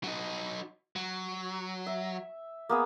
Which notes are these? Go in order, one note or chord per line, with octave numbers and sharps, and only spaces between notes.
F#3 D#4
F#3
E5
A#3 B3 G#4